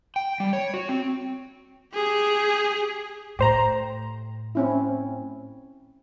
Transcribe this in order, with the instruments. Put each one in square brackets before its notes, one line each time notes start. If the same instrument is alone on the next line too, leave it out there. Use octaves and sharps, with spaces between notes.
[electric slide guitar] G5
G3
C#5
F#4
C4
[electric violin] G4 G#4
[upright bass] A2 [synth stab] G4 C5 A#5
[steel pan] C4 C#4 E4